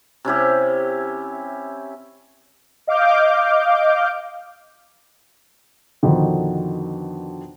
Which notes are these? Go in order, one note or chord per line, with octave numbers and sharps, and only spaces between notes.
C3 C#4 E4 G4
D#5 F5 D6 F6 G6
F2 B2 D3 D#3